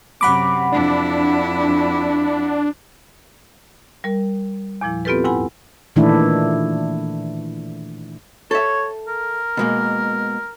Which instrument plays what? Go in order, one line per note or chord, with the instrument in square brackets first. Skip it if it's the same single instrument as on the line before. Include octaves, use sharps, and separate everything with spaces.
[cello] F#2 C3 [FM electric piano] F#5 B5 D6
[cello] F2 E4 [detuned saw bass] D4
[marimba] G3 A#4
E2 A#2 F3 E4
B3 C4 F4 G4 A4 B4
D#2 G#2 E4 F#5 G#5 B5
[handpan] A#2 D#3 E3 A3 D4 E4
[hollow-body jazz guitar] A4 E5 [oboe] C#5
[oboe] A#4
[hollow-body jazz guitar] B2 G#3 A#3